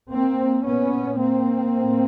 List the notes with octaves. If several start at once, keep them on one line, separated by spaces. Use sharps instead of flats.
A#3 C4
A#2 B3 C#4
A#3 C4
A2